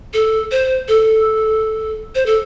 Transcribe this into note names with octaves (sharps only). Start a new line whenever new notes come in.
A4
C5
A4
C5
A4